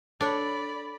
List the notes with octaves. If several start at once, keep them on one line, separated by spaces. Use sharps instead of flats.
D4 A4 C#5 D5 B5